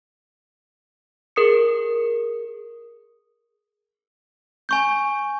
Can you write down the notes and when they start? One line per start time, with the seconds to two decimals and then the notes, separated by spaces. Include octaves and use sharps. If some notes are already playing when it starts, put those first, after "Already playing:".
1.36 G#4 A#4 D#6 C#7
4.69 G#5 C#6 G6